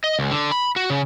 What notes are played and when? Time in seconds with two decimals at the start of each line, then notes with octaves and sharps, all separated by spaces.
0.04 D#5
0.19 C#2
0.31 D3
0.51 B5
0.76 F#4
0.90 C#3